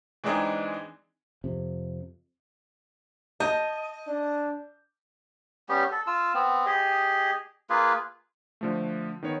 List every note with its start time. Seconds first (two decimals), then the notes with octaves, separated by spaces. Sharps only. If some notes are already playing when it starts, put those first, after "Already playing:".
0.24 E3 G#3 C4 D4 D#4 G#4
1.44 F2 C3
3.40 D#5 A5 G6
4.07 D4
5.69 G3 B3 C#4 G4
5.92 A4
6.07 F4 E6
6.34 B3 C4
6.66 G4 G#4 D#5
7.70 A#3 F4 G#4 B4
8.61 D3 F3 A3
9.23 D#3 B3 C#5